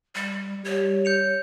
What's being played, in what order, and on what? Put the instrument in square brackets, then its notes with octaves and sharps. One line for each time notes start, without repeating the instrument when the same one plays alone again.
[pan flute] G3
[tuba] G3 [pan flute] C#5
[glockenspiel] G6 C#7 F7